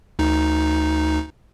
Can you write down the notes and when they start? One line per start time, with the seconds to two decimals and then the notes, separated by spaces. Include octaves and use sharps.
0.19 D2 D#4